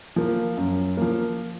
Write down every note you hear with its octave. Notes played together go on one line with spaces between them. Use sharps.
F3 A#3
F#2
F3 A#3